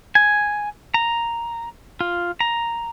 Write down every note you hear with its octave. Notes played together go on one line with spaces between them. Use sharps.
G#5
A#5
F4
A#5